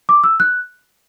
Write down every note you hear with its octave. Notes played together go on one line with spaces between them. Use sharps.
D6
E6
F#6